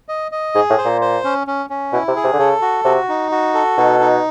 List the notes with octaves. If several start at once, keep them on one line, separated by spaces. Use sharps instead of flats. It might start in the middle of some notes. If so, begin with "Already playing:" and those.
D#5
D#5
G#2 G#4
A2
C5
A#2
C5
C#4
C#4
C#4
B2 E4
C3
G#4
C3
D3
C#3 A4
F#4
C3 F#4
D#4
F#4
A4
B2 D#4
D#4